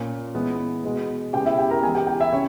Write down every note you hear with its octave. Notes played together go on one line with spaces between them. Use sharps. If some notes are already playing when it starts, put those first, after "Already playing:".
Already playing: A#2 A#3 C#4
E3 G#3 B3
B2 G#3 B3
C#3 G#3 B3 G4 G5
E4 E5
G4 G5
A#4 A#5
E3 G#3 B3 G#4 G#5
G4 G5
G4 G5
E4 E5
C#3 C#4 C#5